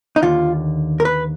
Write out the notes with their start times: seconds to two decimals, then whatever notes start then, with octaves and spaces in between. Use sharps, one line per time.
0.16 D#4
0.22 D#2 D3 F4
1.00 A#4
1.05 B4